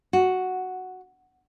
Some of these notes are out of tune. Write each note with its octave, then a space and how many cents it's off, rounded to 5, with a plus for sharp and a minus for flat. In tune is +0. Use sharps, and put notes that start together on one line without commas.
F#4 +0